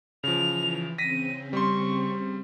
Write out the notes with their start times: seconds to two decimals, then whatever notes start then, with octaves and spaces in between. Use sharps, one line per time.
0.24 C#3 E3 F3 F7
0.98 C#3 C4 A#6 B6 D#7
1.53 G3 C6 C#6